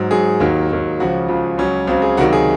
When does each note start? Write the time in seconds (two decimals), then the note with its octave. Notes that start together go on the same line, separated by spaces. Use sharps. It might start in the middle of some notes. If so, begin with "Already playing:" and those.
Already playing: G#2 F#3
0.11 G#2 F#3 G#4
0.40 D#2 D#3 F#3
0.70 D#2 D#3 F#3
1.00 C#2 C#3 F3 F#4
1.28 C#2 C#3 F3 F4
1.58 C#2 C#3 F#3 C#4
1.87 C#2 C#3 F#3 C4
2.02 G#4
2.17 C#2 C3 D#3 F#3 F#4
2.33 G#4